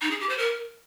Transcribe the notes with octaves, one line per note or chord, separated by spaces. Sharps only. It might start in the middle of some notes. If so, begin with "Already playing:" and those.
D#4
G#4
G4
C5
A#4